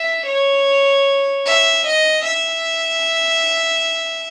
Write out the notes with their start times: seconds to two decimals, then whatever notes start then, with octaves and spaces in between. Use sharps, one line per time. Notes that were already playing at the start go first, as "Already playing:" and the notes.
Already playing: E5
0.27 C#5
1.45 E5
1.85 D#5
2.25 E5